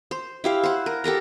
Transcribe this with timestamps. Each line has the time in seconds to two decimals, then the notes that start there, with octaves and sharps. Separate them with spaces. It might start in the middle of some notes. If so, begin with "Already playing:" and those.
0.11 C5
0.44 E4 G4 F5
0.63 C5 F#5
0.86 A#4
1.04 G4 A4 A#4 A#5